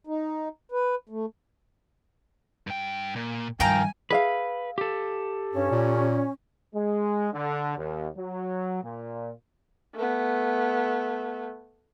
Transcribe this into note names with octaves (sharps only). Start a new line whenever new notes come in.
D#4
B4
A3
G2 G5
A#2
G2 D#3 F3 F5 G5 G#5 A#5
G#4 B4 E5 F5
G4 A4
G2 C#4
A#2
G#3
D3
D#2
F#3
A#2
A3 B3